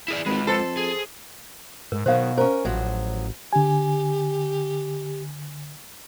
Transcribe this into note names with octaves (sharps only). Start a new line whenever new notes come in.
E4 G#4 D5
G#1 G#3 F4 B4
F2 A4 C5
G#4
G#2 A#4
B2 D#3 F#3 C5 F5
C#4 A#4 C5
A1 F3 F#3
D3 G4 G#5